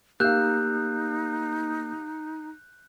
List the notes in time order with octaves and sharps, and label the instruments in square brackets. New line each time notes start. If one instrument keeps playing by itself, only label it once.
[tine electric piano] A#3 E6 [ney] D#4 [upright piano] G4 F5 [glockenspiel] F#6 G6